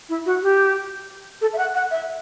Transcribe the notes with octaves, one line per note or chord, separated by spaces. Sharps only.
E4
F#4
G4
A4
E5
F#5
F#5
E5